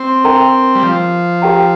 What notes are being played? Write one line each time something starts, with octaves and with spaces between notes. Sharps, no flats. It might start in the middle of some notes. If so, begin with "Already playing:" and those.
Already playing: C4
D4 A#4 G5 A#5
G3
F3
G4 A#4 G5 A#5